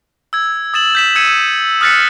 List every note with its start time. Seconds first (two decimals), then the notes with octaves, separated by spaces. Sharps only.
0.33 E6 G#6
0.74 D#6 A6 E7 F#7
0.95 G6 B6 E7
1.16 E6 G#6 C#7 D#7
1.81 D#6 F6 F#6 A6 B6 C#7